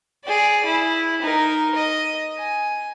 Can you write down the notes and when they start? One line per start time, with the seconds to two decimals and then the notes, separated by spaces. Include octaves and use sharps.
0.24 G#4 D5
0.66 E4
1.22 D#4 A#4
1.75 D#5
2.38 G#5